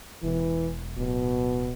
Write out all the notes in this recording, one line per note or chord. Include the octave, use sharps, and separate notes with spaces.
E1 E3
D1 B2